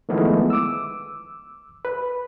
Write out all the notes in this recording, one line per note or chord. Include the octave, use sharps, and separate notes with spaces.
D#3 F3 G#3 A3 B3 E4
D6 E6
B4